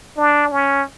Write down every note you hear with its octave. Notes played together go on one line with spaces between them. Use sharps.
D4
C#4